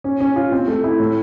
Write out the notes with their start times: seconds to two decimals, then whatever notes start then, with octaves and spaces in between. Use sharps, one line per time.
0.04 C#4
0.20 C#4
0.36 F4
0.52 C4
0.68 A3
0.84 E4
1.00 A2